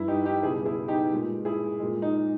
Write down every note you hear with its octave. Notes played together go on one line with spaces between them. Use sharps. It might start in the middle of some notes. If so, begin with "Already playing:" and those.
Already playing: G2 G3 E4
D#4 G4
D#4 G4
C#2 B2 G3 E4 G#4
E4 G#4
D#4 G4
A#2 G#3
E4 G#4
A#2 G#3
D#4